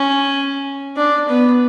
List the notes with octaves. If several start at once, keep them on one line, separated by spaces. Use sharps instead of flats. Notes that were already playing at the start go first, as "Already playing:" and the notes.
Already playing: C#4
D4
B3